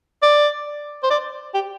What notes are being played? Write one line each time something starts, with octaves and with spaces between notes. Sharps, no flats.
D5
C5
D5
G4